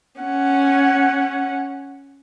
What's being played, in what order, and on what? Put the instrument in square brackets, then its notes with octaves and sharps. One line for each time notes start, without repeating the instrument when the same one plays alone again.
[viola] C#4 F#5